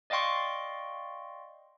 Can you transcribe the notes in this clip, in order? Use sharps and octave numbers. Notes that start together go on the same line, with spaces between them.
D5 D#5 F5 G5 C6 C#6